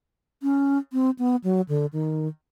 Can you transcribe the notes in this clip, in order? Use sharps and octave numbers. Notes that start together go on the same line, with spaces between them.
C#4
C4
B3
F#3
D3
D#3